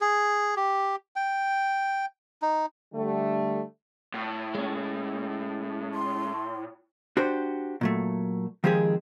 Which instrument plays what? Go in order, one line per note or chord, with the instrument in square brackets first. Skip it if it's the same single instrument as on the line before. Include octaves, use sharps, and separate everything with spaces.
[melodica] G#4
G4
G5
D#4
[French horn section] D3 G3 A3
[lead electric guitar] A2
[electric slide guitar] G#3 C#4
[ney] C6
[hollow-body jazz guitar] D4 F#4 G4 C5
A#2 F#3 A3
D#3 F3 G#3 C4 G4 G#4